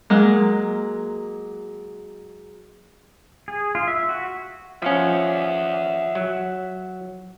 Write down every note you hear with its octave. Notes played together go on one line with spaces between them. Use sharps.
F#3 G#3 A#3
G#4
F4
E5
F#4
F3 C#4 E5 F#5
F#3